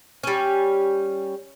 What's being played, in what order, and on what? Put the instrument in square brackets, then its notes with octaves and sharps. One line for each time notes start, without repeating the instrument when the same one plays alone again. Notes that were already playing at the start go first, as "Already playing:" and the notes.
[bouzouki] G3 C#4